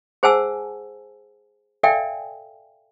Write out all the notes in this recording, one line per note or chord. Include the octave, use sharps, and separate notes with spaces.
G#4 C5 F#5 G#5 A5 E6
A4 D5 E5 F5 G5 G#5